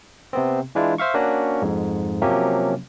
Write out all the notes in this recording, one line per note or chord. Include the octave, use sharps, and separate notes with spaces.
C3 B3 C4
E3 G#3 D4 E4 F4
C5 E5 F5 C#6
A#3 C#4 D4 F#4
F2 G#2
C3 F3 F#3 A#3 C#4 G4